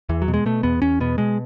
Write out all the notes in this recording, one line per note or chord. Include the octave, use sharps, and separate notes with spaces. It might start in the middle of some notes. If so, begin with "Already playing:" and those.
E2 E3
F#3
B2
G#3
B2 A3
E2 B3
E2 C#4
B2 B3
B2 G#3